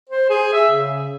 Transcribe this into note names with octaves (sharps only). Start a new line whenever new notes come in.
C5
G#4
E5
C#3